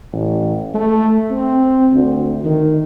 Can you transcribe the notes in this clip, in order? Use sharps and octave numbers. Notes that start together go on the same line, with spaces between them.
A1
A3
C4
D2
D#3